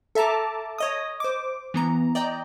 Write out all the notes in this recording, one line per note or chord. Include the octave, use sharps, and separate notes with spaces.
A4 E5 A5 A#5 D6
C#5 D#5 D#6
C5 D6
E3 B3 A#5
D5 D#5 G5 A#5